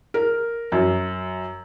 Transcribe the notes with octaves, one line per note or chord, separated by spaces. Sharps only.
A#4
F#2